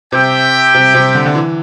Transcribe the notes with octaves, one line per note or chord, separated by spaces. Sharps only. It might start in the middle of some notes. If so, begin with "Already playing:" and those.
C3 C4 G4 E5 G5
C3
C3
D3
D3
E3